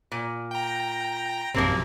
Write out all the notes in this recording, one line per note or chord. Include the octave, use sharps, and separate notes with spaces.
A#2
G5 A#5
A#1 F#2 C3 F3 A#3 C4